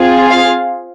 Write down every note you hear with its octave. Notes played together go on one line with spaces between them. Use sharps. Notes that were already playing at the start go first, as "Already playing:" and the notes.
Already playing: C4 F4 G#4
F5